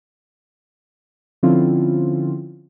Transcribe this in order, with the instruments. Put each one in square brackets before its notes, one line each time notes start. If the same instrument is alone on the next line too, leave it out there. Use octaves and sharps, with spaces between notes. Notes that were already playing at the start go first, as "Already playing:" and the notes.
[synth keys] D3 F3 C4 C#4 E4 F4